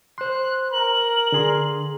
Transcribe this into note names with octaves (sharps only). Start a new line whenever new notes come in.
C5 C6 F#6
A#4 F#7
D3 G#4 C6